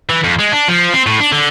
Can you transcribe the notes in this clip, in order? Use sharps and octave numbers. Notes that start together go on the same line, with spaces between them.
E3
F2
G#3
D4
F3
C4
A2
D4
D3